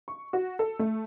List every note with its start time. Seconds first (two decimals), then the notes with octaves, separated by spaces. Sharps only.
0.08 C#6
0.33 F#4
0.59 A4
0.79 A3